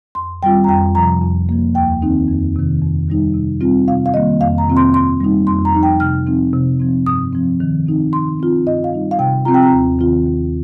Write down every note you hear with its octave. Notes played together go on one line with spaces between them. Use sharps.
F2 C6
D#3 G3 C4 F4 G5
A#5
F2 G5
C3 F3 A#5
F2
F3 A#3
D#2 G5
D#3 C4 D#4
F2
C3 D#3
F2
D#3 G3 D#4
C3
G3 C4 F4
C3 F5
F5
D#3 G3 A#3 D#5
F2 F5
A#5
C3 D#3 C4 F4
C6
G2 C6
G3 A#3 D#4
F2 C6
A#5
F3 D#4
G5
C3 F6
F3 C4 D#4
C3
F3 C4
G2 D#6
F3 C4
D#3
C4 D#4
D#3 C6
C4 F4
G2 D#5
F5
G3 D#4
F5
C3 G5
F3 C4 F4 A#5
G5
A#5
D#2
D#3 C4 F4
D#2